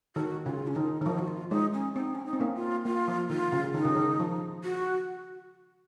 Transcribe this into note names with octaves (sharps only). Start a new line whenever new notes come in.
D#3 F#4
C#3 F4
C#4
D#3 D#4
D#3
F3 D#4
F#4
F4
G#3 D#4
C#4
C4 D#4
C#4
D#4
C4
A#3 C#4
F4
A#3 F4
F3
D#3 F4
C#3
D#3 D#4
C#3
D#3
F3
F#4